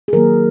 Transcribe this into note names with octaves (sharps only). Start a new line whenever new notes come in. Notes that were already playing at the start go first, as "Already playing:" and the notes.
G#4
D#3 F#3 A#3 A#4